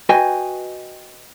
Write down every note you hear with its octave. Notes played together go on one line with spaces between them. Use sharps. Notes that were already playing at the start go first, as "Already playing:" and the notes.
F#4 B4 D#5 G5 G#5